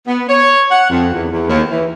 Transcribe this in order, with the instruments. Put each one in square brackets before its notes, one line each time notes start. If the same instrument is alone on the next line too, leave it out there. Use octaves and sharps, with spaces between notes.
[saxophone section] B3
C#5
F#5
F2
E2
E2
D#2
E3